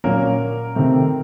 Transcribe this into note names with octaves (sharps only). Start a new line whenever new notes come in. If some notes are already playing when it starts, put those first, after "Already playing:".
A#2 F#3 A#3 C#4 A#4
C3 D#3 A3 C4